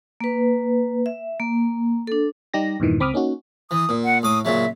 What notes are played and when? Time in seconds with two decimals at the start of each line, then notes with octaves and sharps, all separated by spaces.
0.21 A#3 B4
1.06 E5
1.40 A#3
2.07 D4 A4
2.54 G3 D#4 G4 A#6
2.80 E2 G2 A#2 D#3 E3
3.00 C#2 C4 B5 D6 D#6 F6
3.14 A#3 C#4 D#4 F#4
3.71 E3 D#6
3.89 A#2
4.05 F#5
4.23 A2 D6 D#6
4.45 A#2 C#3 F#3 E5